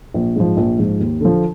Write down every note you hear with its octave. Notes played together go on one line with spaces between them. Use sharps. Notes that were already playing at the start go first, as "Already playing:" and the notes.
A#1
G#2 F3
A#1
G#2 F3
D#2
D3 F3